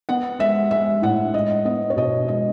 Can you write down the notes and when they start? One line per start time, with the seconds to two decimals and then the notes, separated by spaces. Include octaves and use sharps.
0.09 B3 F#5
0.39 G#3 E5
0.71 G#3 E5
1.02 A2 F#5
1.34 G#3 D#5
1.65 B3 D#5
1.90 C#5
1.96 B2 D#5
2.28 G#3 D#5